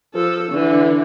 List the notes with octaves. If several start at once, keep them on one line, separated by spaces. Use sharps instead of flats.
F3 A4
D3 E3